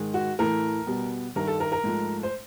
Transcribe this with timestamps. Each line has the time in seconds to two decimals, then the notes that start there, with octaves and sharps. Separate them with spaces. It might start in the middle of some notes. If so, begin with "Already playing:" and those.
Already playing: G#2 D#3 G#3
0.14 F#4
0.39 A2 E3 A3 A#4
0.87 B2 G3 B3
1.36 G2 D#3 G3 A#4
1.47 A4
1.60 A#4
1.72 A#4
1.84 G#2 F3 A3
2.23 C5